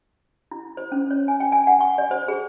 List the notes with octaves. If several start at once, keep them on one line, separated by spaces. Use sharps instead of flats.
E4
C5
C#4
C#5
G#5
G5
G#5
F#5
C#6
D5
C5
G#4